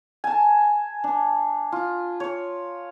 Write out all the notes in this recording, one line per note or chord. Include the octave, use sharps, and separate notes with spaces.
G#5 A5
D4
F4
C#5